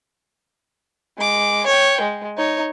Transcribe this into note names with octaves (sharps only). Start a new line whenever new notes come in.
G#3 D6
C#5 G5
G#3
D#4 C#5